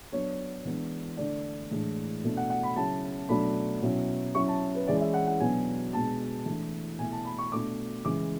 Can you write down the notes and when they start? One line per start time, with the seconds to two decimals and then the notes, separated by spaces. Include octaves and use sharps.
0.12 F#3 B3 D4 C#5
0.65 E3 G#3 B3 D4
1.17 D3 A3 D4 D5
1.71 A2 E3 G#3 D4
2.24 B2 A3 D4
2.37 F#5
2.50 F#5
2.63 B5
2.76 C#3 F#3 C#4 E4 A5
3.29 B2 F#3 A3 D4 B5
3.82 B2 F#3 C#4 E4
4.35 F#3 C#4 E4 C#6
4.48 A5
4.75 B4
4.87 E3 G#3 C#4 E4 D5
5.01 E5
5.14 F#5
5.27 F#5
5.40 B2 F#3 B3 D4 G#5
5.93 B2 G#3 B3 D4 A5
6.46 E3 A3 D4
6.99 B2 A3 E4 G#5
7.12 A5
7.25 B5
7.38 C#6
7.52 B2 A3 D4 D6
8.04 C#3 E3 G#3 D6